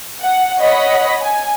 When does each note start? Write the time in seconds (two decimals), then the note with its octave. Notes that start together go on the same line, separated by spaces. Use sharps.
0.21 F#5
0.60 C#5 D#5 F#5 B5
1.23 G#5